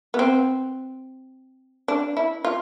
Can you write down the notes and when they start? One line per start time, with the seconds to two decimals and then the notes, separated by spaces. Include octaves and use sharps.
0.14 B3
0.19 C4
1.88 D4
2.17 E4
2.45 F4